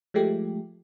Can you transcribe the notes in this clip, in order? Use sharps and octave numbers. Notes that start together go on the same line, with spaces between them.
F3 G#3 A3 G4